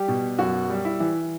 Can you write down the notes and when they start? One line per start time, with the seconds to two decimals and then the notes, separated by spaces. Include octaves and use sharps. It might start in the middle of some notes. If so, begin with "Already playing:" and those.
Already playing: G3 G4
0.08 B2
0.39 F#2 F#4
0.70 G3
0.85 E4
1.00 E3